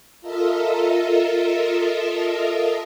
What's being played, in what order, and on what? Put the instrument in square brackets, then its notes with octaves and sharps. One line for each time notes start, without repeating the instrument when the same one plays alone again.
[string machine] F4 A4 A#4 D#5 E5